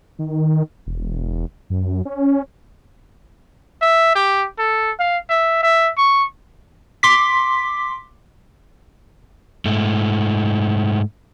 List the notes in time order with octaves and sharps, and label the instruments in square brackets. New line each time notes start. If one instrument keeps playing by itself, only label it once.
[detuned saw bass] D#3
E1
F#2
C#4
[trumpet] E5
G4
A4
F5
E5
E5
C#6
[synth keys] C6 D6 B6
[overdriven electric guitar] G#2 A3